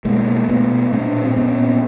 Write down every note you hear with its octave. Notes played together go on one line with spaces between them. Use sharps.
B2 G#3 A#3
B2 A3 B3
A#2 C4 D4
C4
A#2 B3 C#4